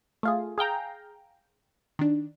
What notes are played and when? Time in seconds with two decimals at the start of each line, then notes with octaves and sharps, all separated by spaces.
0.23 A3 F4 G#4
0.58 G#4 F5 G5 A#5
1.99 D#3 D4